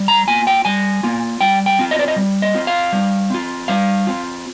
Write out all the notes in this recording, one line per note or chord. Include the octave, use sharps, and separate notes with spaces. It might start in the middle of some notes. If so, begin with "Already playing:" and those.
Already playing: G3
A#5
A#3 F4 G#5
G5
G3 G#5
A#3 F4
G3 G5
G5
C4 F4
D#5
D5
D#5
G3
D#5
C4 F4
F5
G3
C4 F4
G3 F5
C4 F4